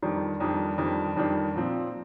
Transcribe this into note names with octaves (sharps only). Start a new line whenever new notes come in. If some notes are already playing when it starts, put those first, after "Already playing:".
F2 D#3 G3 D4
F2 D#3 G3 D4
F2 D#3 G3 D4
F2 D#3 G3 D4
A#2 F3 C4